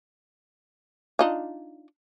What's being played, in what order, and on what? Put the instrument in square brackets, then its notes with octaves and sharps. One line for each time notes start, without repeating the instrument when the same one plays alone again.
[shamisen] D4 D#4 F4